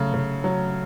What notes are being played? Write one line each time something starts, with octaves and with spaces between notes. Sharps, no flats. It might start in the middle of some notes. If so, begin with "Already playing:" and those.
Already playing: C#3 F#3 A3
C#3
F#3